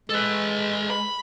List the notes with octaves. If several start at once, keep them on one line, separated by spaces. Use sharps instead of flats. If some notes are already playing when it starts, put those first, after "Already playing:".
G#3 A4 B4
B5